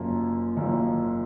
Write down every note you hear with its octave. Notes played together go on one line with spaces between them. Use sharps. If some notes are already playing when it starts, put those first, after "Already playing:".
Already playing: F#1 F#2 F3 A#3 F4
F#1 F#2 F3 A#3 F4